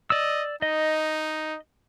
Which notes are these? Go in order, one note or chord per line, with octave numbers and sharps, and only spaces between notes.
D5 D#5 E6
D#4 D#5